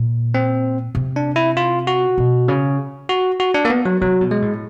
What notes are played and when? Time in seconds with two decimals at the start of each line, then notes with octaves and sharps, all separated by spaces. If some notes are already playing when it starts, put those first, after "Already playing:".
Already playing: A#2
0.34 C4
0.95 C3
1.16 D4
1.36 E4
1.57 F4
1.87 F#4
2.18 B2
2.48 C#3
3.09 F#4
3.40 F#4
3.55 D4
3.65 A#3
3.70 B3
3.85 F#3
4.02 C3 F#3
4.21 B2
4.31 G#3
4.42 A2